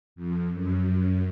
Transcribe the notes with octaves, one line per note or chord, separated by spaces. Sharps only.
F2
F#2